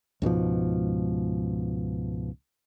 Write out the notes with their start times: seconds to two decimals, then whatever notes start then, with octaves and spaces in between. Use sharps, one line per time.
0.22 C#2 G#2 B2 F3